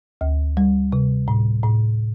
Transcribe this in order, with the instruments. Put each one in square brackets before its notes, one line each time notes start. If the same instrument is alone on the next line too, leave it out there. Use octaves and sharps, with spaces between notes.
[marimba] D2
G3
C3
A2
A2